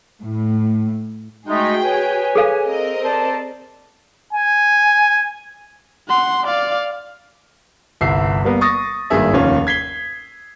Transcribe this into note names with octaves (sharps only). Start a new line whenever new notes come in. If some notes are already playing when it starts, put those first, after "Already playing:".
A2
G#3 A3 D#4 F#4 G#4 G5
B4 C#5 G#5
G#4 A4 F5
C4 A#4 D#5
C5 D5 A5
G#5
F#5 C6
D5 F5
G1 C2 E5 C7
G3 A#3 B3 A#4
C#6 D#6 A6 A#6
G#1 G2 A#3 G#4 E5
F1 D#2 C#4 F4
G#6 B6 C7 G7